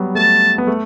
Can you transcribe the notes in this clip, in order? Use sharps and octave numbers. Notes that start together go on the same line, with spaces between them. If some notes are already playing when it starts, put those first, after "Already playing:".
Already playing: F#3 G3 B3
A3 A5
B3
A3